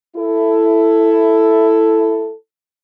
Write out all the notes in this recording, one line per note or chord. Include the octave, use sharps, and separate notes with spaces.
E4 A4